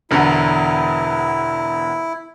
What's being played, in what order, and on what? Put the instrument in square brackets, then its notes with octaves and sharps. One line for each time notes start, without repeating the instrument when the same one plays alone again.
[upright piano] E1 E2 D3 [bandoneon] E4